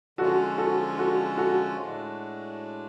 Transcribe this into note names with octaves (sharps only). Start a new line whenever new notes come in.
D3 F3 G#3 C#4 F4 F#4 A4
F#4 A4
F#4 A4
F#4 A4
A2 G#3 D4